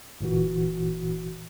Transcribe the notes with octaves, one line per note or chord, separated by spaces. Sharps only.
G1 A#2 E3 F#4